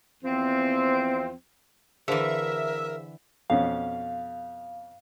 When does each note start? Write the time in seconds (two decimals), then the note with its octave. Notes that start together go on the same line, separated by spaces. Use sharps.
0.24 E2 F3 C4
2.08 D3 E3 G#4 A#4 C5 E5 F5
3.50 F2 B2 C#4 F5